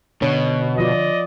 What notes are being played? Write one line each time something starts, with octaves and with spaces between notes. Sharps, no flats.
B2 D3 C#5
F3 F4 D5 D#5